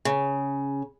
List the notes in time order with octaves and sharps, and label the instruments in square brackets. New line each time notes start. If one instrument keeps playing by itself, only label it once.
[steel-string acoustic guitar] C#3